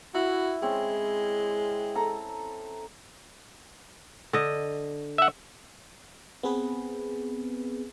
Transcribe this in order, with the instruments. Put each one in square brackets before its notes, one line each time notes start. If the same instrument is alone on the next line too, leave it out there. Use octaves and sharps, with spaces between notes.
[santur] E4 [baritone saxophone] F#4
[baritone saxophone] G#3 [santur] C4 C#4
[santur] A4 A#5
[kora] D3 D#5
[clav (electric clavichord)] E5 F#5
[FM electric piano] B3 C4 G#4 B4